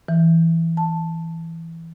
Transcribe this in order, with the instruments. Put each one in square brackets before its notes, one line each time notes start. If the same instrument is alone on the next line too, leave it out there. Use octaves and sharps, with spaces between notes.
[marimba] E3
A5